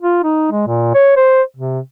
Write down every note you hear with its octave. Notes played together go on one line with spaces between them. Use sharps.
F4
D#4
G#3
A#2
C#5
C5
C3